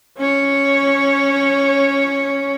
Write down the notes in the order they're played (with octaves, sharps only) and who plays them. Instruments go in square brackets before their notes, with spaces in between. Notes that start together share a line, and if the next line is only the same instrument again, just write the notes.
[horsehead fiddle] C#4 C#5